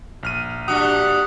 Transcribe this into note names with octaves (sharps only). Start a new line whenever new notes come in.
A#1 F6 D#7
G3 D4 F#4 F#5 D#6